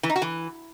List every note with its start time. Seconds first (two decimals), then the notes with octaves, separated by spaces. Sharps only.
0.03 E3
0.10 D#4
0.16 F#4
0.22 E3